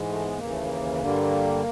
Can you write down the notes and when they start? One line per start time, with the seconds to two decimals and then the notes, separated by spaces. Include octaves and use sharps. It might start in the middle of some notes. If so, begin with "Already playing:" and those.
Already playing: G#2 E3 G#3
0.09 A3
0.24 B3
0.37 D#2 C#3 E3 A#3
0.51 A3
0.64 A#3
1.00 G2 D3 G3 A#3